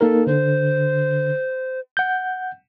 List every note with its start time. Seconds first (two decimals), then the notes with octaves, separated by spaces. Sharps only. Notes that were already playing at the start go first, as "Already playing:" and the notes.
0.01 A#3 D#4 A4 A#4
0.27 D3 C5
1.97 F#5 G6